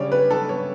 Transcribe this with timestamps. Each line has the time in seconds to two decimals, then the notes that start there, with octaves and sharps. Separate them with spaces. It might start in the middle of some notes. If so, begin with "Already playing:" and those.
Already playing: C#3 G3 C#5 D5
0.11 B3 B4
0.30 B3 A4
0.49 B3 C#5